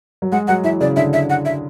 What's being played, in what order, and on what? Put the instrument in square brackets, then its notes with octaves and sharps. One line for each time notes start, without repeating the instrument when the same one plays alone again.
[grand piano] F#3
[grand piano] G#3 [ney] F#5
[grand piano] F#3 [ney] F#5
[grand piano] E3 [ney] E5
[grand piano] C#3 [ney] D5
[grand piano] D3 [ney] E5
[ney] E5
F#5
E5